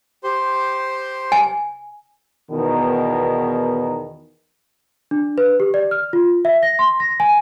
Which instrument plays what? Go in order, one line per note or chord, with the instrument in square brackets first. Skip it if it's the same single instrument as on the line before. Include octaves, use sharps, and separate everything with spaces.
[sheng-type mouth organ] G4 C5 C6
[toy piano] G#5
[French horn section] E2 B2 D#3
[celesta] D4
B4
G4
D5
F6
F4
E5
A#6
C6
A#6
G#5